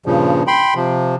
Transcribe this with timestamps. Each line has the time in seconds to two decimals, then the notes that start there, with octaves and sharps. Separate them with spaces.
0.06 G2 A#2 C#3 F3
0.47 G5 B5 C6
0.75 C3 F3